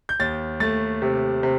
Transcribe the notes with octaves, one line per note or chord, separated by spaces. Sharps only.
G6
D#2 A6
A3 A6
C3
C3